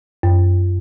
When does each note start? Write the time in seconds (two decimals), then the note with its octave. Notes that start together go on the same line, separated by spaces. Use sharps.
0.23 F#2